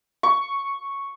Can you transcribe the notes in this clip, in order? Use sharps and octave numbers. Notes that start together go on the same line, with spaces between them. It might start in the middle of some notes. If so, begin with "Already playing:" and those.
C#6